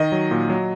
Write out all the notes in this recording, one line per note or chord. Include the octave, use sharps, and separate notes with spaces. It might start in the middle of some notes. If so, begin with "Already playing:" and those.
Already playing: D#3 D#5
F#3
A#2
F#3